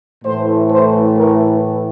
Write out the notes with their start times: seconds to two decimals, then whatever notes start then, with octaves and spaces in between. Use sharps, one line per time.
0.24 A2 E3 A3 C5
0.71 C5
1.17 A#4